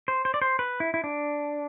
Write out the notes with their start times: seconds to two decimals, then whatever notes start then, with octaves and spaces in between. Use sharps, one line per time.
0.08 C5
0.25 C5
0.34 D5
0.42 C5
0.59 B4
0.80 E4
0.94 E4
1.04 D4